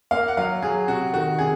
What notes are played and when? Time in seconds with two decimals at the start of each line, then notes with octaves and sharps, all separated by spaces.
0.11 A#3 F5
0.28 F#5
0.37 F#3 F5
0.62 F#3 G#4
0.88 C3 F#4
1.13 D#3 F#4
1.39 C3 G#4